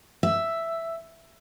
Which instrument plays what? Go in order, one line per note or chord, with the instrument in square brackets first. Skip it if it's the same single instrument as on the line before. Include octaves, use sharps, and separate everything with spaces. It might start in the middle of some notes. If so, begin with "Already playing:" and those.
[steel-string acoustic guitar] E5